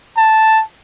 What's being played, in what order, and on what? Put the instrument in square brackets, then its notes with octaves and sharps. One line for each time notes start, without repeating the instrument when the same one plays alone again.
[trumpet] A5